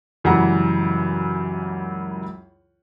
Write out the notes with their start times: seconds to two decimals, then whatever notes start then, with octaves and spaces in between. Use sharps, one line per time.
0.24 C#2 F#2 E3 G3 F#5 A#5